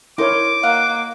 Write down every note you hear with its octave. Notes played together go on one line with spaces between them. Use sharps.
D#4 E4 A#4 C5 C#5 D6
A#3 D#5 F5 F#5